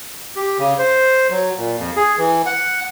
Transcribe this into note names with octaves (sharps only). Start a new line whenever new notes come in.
G4
C#3
C5
F#3
A#2
F2
G#4
E3
F#5